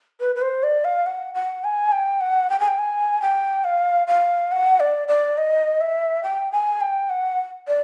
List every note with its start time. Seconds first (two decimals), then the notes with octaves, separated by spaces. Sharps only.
0.20 B4
0.36 B4
0.42 C5
0.63 D5
0.85 F5
1.06 F#5
1.34 F#5
1.64 G#5
1.92 G5
2.21 F#5
2.50 G5
2.60 G#5
2.68 G5
2.79 G#5
3.22 G5
3.64 F5
4.07 F5
4.52 F#5
4.80 D5
5.08 D5
5.38 D#5
5.81 E5
6.23 G5
6.52 G#5
6.81 G5
7.10 F#5
7.68 D5